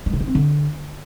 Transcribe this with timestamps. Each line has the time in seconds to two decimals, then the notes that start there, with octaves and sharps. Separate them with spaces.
0.06 G#3
0.13 C#3
0.21 D#4
0.28 C4
0.35 D3